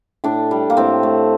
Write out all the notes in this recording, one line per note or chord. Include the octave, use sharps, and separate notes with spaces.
A2 D4
G3
A#3
A2 C4
A3